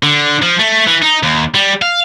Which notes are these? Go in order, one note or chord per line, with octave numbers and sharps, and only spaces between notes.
D3
F3
A3
E3
D#4
D#2
G3
F5